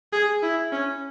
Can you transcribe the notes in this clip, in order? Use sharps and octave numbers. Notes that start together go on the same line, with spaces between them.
G#4
E4
C#4